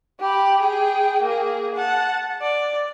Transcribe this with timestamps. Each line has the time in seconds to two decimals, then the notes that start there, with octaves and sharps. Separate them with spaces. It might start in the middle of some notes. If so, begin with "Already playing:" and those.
0.20 G4 B5
0.61 G#4 G5
1.22 A#3 G#4
1.74 F#5 A5
2.42 D5